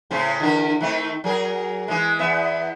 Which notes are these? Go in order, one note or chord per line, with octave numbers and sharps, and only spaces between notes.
A2 C#3 C4
D3 E3 A#4
D#3 A3 C4
F#3 G#4 A#4
E3 G#3
E2 B3 E5